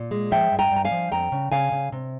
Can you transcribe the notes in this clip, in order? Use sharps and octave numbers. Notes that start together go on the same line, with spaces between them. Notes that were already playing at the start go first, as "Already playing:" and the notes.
Already playing: A#2
G#3
F3 E5 G5
G2
G5 A#5
G2
A#5
F5 G#5
F3
F2 G5 A#5
C#3
C#3 F5 G#5
C#3
C3